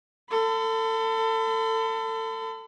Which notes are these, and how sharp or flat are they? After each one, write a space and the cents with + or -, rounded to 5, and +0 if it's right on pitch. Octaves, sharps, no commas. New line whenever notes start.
A4 +25 B5 +45